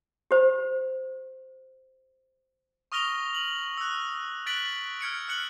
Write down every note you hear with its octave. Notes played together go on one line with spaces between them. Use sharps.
G4 C5
C#6 D#6 F6 A#6 F7 G7
F#7
E6 F#6
F#6 A6 B6 D7 F#7
F6 G#6 C#7 D7
F6 F#6 C#7 F#7